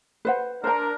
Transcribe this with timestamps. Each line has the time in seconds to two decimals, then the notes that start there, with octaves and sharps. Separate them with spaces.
0.25 B4 C5 F#5
0.64 D4 A#4 C5 A#5